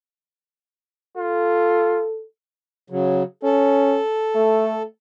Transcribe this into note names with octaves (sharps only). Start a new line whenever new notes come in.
F4 A4
C#3 F#3
C#4 A4
A3